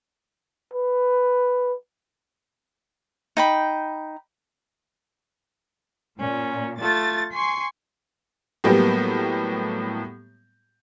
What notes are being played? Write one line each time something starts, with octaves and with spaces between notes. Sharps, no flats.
B4
D#4 G5 B5
A#2 C#4
A3 F4 A6
G#5 C6 C#6 C7
A2 F#3 G3 A#3 B3 G4